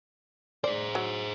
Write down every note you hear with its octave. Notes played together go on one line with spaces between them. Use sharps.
G#4 C5 D5
F#3